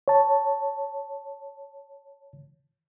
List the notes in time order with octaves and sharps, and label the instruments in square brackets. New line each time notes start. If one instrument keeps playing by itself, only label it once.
[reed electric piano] C#5 A5